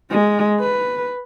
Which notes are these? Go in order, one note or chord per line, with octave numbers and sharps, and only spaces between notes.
G#3
B4